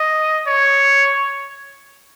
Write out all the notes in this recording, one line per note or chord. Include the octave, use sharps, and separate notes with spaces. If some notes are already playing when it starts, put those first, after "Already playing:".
Already playing: D#5
C#5